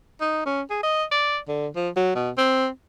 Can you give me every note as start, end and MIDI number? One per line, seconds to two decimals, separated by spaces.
0.21 0.45 63
0.46 0.62 61
0.70 0.82 68
0.83 1.04 75
1.11 1.38 74
1.48 1.67 50
1.76 1.89 53
1.96 2.13 54
2.15 2.30 47
2.38 2.68 60